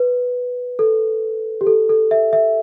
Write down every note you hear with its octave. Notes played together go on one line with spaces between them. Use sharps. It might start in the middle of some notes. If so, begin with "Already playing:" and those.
Already playing: B4
A4
G4
A4
A4
E5
E5